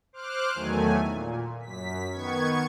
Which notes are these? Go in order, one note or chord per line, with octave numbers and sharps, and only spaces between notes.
C5 D6 F6 F#6
E2 D#3 F#3 A3 G#5
A#2
F#2 B6
D#3 B3 C#6 G#6